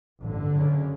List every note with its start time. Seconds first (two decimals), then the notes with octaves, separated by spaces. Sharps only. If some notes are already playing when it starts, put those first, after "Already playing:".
0.21 A1 G2 D3
0.52 F#1 F#2 C#3